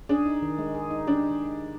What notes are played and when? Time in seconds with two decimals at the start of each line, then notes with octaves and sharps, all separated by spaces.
0.09 D4 G#4
0.26 D#4
0.42 D#3
0.59 G#3
0.75 G#4
0.91 D#4
1.07 D4 G4